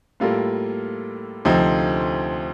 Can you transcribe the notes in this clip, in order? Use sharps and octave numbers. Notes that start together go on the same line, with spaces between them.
A2 G3 A#3 F4 A4
D2 C3 F3 C4 D#4